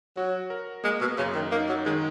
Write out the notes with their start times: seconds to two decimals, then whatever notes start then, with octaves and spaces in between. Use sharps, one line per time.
0.16 F#3 F#4
0.50 A#4
0.84 G#3 A#3
1.01 B2
1.18 F#2 C#3
1.35 D#3
1.52 A#3 D#4
1.69 F#3
1.86 D#3 G#3